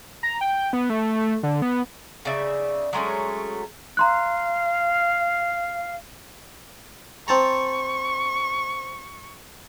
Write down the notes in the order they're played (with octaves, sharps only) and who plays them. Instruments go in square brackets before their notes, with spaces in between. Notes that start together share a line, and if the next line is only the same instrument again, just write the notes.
[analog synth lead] A#5
G5
B3
A3
D3
B3
[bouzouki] C#3 D#4 D5 E5
F#3 G#3 A3 C#4
[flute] F5 [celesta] A#5 C6 F#6
[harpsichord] C4 A5 A#5 [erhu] C#6